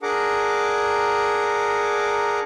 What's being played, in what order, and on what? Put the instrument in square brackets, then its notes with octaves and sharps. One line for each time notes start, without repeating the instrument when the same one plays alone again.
[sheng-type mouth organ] D4 G#4 A#4 F#5 A#5 D6